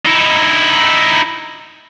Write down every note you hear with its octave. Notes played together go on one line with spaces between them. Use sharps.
D#4 E4